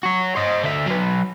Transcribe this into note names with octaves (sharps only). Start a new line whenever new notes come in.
F#4 C#5
C5 D#5
D3 E5
F#3 B4